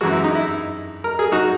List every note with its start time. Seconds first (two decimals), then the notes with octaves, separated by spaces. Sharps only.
0.01 F#2 E3 G#3 F#4
0.12 E4
0.24 D#4
0.35 E4
1.04 A#4
1.19 G#4
1.32 D#4 F#4